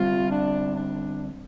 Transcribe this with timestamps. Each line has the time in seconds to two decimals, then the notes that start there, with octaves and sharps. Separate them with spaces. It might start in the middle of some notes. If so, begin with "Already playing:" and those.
Already playing: D3 G3 C4 F4
0.30 D4
0.75 D4